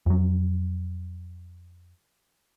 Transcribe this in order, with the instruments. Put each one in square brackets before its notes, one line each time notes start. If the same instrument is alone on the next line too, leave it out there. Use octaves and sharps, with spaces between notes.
[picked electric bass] F2 F#3